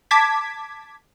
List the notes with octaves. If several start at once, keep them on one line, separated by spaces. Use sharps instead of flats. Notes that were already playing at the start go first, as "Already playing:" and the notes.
A5 D6 G#6 B6